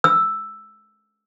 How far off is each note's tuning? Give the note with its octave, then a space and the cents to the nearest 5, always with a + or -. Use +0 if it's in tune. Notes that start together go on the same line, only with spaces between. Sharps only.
E6 +5